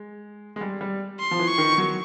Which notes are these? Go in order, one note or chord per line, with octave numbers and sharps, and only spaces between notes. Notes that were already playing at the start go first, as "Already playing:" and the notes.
Already playing: G#3
G#3
G3
G3
C6
F3
E3
C#6
D#3
F#3